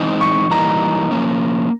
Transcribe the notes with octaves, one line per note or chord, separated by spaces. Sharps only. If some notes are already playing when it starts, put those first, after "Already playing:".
Already playing: E3 G#3 C4 D#4
C#6
E3 G3 A#3 D#4 A#5
F3 A#3 C#4